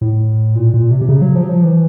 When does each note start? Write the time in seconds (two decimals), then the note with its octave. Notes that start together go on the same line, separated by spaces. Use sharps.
0.01 A2
0.55 A#2
0.74 A#2
0.91 C3
1.01 C3
1.09 C#3
1.22 F#3
1.35 F3
1.43 F#3
1.49 F3
1.63 E3